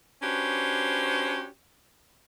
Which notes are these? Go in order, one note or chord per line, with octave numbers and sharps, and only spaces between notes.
C#4 D4 F#4 G4 B4 C5